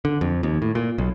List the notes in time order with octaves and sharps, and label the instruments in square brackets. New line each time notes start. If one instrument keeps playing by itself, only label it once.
[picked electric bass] D3
F2
D#2
A2
A#2
B1